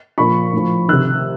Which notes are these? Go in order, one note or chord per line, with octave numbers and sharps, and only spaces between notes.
A#2 F3 B5 C#6
A2 F3
C3 D#3 E6 F#6